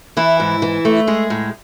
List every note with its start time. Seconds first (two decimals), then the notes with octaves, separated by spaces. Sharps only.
0.17 E3 E4
0.40 G#2
0.62 E3
0.85 A3
1.07 G#3 G#4
1.30 A2